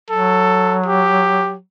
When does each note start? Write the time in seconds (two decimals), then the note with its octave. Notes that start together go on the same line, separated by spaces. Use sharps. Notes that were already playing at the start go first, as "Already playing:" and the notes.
0.10 F#3 A4
0.86 G4